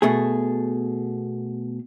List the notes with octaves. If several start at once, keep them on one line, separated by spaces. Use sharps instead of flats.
B2 A3 G#4